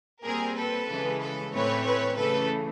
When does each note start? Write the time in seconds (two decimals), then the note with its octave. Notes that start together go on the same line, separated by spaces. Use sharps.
0.24 A#2 G3 C4 G#4 A#4
0.56 A4 B4
0.88 C#3 E3 G#3
1.20 A4 B4
1.52 A2 E3 A3 C4 B4 C#5
1.85 B4 C#5
2.17 C#3 E3 A3 A4 B4